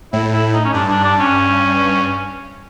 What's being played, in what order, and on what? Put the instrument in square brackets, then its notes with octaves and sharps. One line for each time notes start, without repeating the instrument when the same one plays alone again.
[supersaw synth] A2 [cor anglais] E4
[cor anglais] E4
D#4
C#4
[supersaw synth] G2 [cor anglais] D4
[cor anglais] D4
D4
C#4